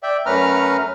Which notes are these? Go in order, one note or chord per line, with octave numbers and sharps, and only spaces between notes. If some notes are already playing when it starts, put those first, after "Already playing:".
D5 E5 G5
F#2 A3 C#4 B4 A#5 F6